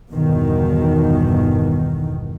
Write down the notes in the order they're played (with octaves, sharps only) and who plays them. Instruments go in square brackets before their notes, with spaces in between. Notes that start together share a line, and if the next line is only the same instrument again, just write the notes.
[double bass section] G1 E2 B2 D#3